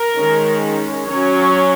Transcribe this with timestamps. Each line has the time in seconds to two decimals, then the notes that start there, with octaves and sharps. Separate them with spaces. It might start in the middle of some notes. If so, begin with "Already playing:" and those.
Already playing: A#4
0.16 D#3 G#3 C#4
1.08 F#3 C#4 C#5